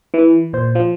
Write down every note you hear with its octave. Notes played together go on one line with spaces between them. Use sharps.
E3
A#2 C5
F3